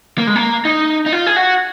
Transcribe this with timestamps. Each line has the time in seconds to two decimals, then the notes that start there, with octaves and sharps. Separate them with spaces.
0.18 A#3
0.27 G#3
0.36 A#3
0.65 D#4
1.06 D#4
1.12 F4
1.27 G#4
1.36 F#4